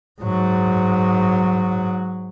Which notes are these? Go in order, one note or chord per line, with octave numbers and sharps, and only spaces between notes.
G#2 F#3